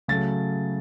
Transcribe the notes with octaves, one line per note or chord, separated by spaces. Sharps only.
C#3 F#3 A3 A6